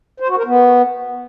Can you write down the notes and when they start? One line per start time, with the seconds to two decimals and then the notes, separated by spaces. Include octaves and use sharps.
0.20 C5
0.29 F#4
0.37 A#4
0.46 B3